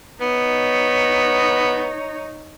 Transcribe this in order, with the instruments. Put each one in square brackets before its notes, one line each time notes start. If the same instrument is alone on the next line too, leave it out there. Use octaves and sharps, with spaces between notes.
[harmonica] B3 [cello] D#4 C#5